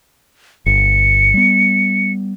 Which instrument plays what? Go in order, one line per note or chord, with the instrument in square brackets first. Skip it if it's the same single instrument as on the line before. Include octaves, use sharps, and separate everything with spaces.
[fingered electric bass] G1 [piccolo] C#7
[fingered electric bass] G3 B3